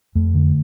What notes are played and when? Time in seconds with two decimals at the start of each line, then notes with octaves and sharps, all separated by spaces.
0.15 F2 A3
0.35 D3